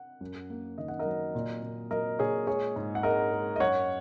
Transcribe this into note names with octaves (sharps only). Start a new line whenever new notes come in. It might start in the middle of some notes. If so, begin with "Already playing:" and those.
Already playing: F#5
F#2
A#3
D#3 D#5
F#5
A#4 D#5
F#3
A#2
A#2
F#3 A#4 D#5
A#2 G#4 C#5
G#3 G#4 C#5
G#2
F#5
G#3 A#4 D#5
G#3
D#5
F#2 C#5 F#5